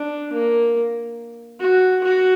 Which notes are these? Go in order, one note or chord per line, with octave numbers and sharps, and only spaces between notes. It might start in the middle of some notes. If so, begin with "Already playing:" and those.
Already playing: D4
A#3
F#4
F#4